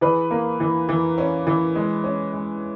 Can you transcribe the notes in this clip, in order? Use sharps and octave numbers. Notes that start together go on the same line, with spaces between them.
E3 G#4 B4
A#3
E3
E3
C#4
E3
G#3
C#4
G#3